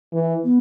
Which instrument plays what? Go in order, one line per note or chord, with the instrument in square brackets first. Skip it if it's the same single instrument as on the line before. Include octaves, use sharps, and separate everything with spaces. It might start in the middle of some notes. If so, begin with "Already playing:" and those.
[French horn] E3
[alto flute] B3